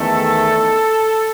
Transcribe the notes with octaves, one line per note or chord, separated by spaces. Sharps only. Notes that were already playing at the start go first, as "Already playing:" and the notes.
Already playing: E2 D#3 A3 A4